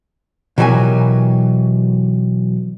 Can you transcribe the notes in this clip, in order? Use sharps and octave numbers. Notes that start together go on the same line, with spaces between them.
B2 E3 F#3 G4 A#4 G#5